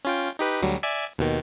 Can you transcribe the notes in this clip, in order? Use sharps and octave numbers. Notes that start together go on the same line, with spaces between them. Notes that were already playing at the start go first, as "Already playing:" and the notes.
C#4 F4 G5
D#4 G4 B4
D2 F#3 G3
D5 E5 G#5
D#2 B2 D#3